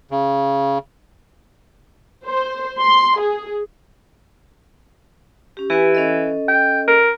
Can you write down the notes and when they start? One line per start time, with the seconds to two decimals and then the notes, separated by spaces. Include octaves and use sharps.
0.11 C#3
2.25 C5
2.79 C6
3.18 G#4
5.57 C#4 G4
5.70 E3 G4 B4 G#5
5.95 C#4 A4 D#5
6.48 G5
6.88 A#4